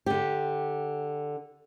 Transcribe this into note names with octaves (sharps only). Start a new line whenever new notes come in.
D3 G4